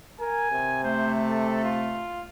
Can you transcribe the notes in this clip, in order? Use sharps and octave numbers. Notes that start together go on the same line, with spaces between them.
A#4 G#5
C3
A3 C5
A4
F4